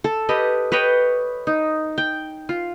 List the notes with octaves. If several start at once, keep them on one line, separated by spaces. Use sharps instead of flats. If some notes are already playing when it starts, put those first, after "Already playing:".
A4
G4 B4 D#5
B4 C#5 D#5 G5
D#4
G5
F4